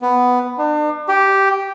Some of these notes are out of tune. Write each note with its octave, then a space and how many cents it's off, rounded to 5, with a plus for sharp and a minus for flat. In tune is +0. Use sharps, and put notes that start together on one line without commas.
B3 +5
D4 +40
G4 -5